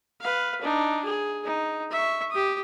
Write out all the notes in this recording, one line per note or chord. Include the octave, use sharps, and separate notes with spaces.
B4 F5
D4 D#4
G#4
D#4
E5 C#6
G4 D#6